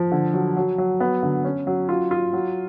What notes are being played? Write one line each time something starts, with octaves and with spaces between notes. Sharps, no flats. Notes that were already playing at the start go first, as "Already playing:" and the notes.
Already playing: F3
D3
F#3
F#3
F#3
B3
D3
C#4
F#3
F4
F4
F#3